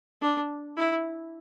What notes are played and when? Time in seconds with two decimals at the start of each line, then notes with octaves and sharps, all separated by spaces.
0.22 D4
0.77 E4